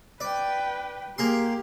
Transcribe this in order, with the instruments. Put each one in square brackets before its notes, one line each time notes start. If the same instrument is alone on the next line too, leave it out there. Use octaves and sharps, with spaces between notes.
[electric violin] B4 G5 [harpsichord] D5
[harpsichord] A#3 G#4 C6 [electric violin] G4